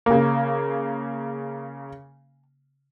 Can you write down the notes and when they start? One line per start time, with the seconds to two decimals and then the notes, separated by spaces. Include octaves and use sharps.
0.06 C#3 A#3